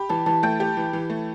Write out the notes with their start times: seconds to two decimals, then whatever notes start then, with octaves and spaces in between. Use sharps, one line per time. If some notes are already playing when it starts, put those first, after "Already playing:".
Already playing: G4 B5
0.09 E3 A5
0.26 E3 A5
0.43 A3 G5
0.60 G4
0.77 E3
0.93 E3
1.10 A3